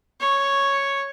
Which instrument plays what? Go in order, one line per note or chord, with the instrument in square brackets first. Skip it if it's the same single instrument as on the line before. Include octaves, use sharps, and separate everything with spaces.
[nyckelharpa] C#5 C#6